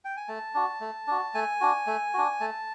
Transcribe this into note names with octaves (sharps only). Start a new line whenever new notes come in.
G5
G#5
A3 A5
D4 F#4
A3
D4 F#4
A3 G#5
D4 F#4
A3
D4 F#4
A3 A5